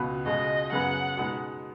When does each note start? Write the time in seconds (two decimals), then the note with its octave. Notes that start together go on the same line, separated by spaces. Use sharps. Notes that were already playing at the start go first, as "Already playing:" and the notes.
Already playing: C#2 B2 B3 F#4 B4
0.26 C#2 B2 G#3 D#5
0.72 F#2 C#3 B3 G#4 B4 F#5
1.17 B2 G#3 B3 D#4